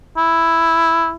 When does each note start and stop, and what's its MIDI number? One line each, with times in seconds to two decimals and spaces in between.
0.17 1.14 64